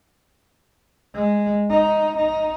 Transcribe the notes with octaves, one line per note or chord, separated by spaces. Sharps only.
G#3
D#4
D#4